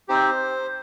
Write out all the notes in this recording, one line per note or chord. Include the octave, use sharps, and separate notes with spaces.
C4 D#4 G4 C5